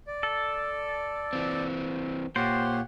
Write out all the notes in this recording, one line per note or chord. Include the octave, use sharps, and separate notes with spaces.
D5
A4
E3 C4
A#2 G4 C5 C#5 F#5